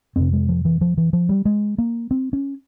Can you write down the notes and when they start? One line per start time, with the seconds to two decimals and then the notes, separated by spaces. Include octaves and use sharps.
0.16 F2 C3 C4
0.33 G#3
0.49 F3
0.65 E3
0.81 F3
0.98 E3
1.13 F3
1.29 G3
1.45 G#3
1.78 A#3
2.11 C4
2.33 C#4